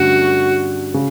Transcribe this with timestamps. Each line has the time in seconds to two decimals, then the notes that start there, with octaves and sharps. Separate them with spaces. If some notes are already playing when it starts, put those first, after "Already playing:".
Already playing: G2 D3 A3 C#4 F#4
0.94 C#3